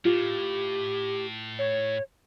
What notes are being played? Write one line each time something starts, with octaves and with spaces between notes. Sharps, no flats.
A2 F4 G4
C#5